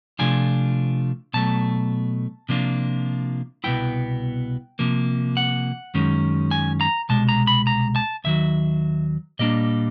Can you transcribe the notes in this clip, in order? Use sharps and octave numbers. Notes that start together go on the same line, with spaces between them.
C3 F3 A3 D4 F4 G#5
B2 F#3 A3 A5
C3 F3 A#3 D4 F4
C2 B2 G#3 B3 E4 G5
C3 F3 A#3
F#5
F#2 D#3 G#3 C#4
G#5
A#5
C2 B2 G#3 A5
A#5
B5
A#5
A5
D#2 D#3 F#3 E5
A#2 G3 A#3 D4 D#5